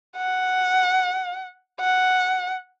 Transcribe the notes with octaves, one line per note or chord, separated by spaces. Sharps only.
F#5
F#5